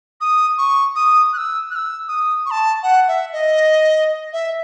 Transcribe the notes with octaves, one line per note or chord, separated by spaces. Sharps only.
D#6
C#6
D#6
F#6
E6
F#6
E6
D#6
C#6
A5
F#5
E5
D#5
E5